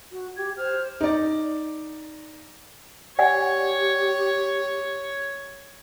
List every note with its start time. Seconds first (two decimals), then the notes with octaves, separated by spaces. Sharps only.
0.12 F#4
0.37 G4 G#6
0.57 C5 F6
1.01 D#4 D5
3.19 G4 C#5 D5 F#5 G#5